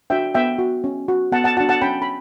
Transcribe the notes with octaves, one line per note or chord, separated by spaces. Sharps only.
D4 F#4 E5 G5
B3 E5 G5
F#4
C#4
F#4
B3 F#5 A5
F#5 A5
D4 F#4 F#5 A5
F#5 A5
C#4 G5 B5
B5